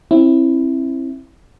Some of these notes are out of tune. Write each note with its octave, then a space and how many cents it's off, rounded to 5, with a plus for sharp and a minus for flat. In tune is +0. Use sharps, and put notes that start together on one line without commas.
C4 +35 E4 +0